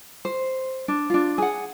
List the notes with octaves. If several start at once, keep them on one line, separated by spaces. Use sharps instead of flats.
C5
D4
D4 F4
G#4 F#5